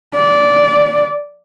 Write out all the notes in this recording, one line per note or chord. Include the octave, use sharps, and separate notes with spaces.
D5